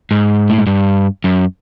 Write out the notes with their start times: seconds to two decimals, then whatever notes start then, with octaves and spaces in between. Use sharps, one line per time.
0.11 G#2
0.50 A2
0.58 G#2
0.67 G2
1.24 F#2